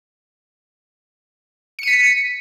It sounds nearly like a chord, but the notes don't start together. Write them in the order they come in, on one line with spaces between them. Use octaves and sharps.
C#7 D#7 B6